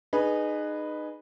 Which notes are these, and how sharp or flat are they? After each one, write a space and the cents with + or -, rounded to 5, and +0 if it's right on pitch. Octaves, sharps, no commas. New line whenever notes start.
D#4 -25 G#4 +5 B4 +0